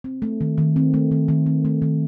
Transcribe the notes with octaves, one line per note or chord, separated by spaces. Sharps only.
C4
A3
D#3
D#3
C4
A3
D#3
D#3
C4
A3
D#3